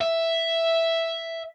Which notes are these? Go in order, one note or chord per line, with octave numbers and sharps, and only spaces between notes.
E5